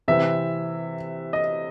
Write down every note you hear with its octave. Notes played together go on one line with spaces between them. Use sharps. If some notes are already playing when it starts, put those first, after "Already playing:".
C3 E3 C4 E5
D#5